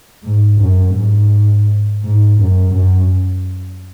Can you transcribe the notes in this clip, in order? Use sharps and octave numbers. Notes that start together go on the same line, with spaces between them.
G#2
F#2
G#2
G#2
F#2
F#2